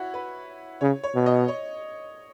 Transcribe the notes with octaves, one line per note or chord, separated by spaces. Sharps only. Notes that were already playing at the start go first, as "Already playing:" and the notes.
Already playing: E4 F#4 C#5
B4
C#3 C#5
C#5
B2
D#5
C#5